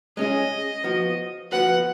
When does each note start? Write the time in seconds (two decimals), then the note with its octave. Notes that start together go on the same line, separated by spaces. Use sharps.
0.17 G#3 C#4 G#4 D#5
0.84 F3 B3 F#4
1.52 F3 B3 F#4 B4 F#5